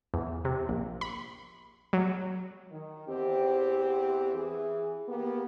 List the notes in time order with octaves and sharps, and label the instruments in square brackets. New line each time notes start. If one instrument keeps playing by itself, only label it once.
[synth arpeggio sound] E2
C3
A#1
B5
F#3
[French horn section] D#3
E2 C4 G4
E3 G#4
A#3 B3 G4